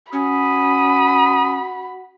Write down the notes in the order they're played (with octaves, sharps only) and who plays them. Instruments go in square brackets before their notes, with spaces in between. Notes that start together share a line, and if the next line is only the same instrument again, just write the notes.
[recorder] C#4 [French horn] F#4 [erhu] B5 [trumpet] D#6